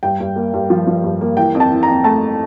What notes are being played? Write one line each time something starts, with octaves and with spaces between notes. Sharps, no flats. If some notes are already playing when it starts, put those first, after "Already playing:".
G2 G5
G2
A#3
G2
F3
F3
G2
A#3
E3 G5
F2
A5
E3
A#5
F2
A3 A5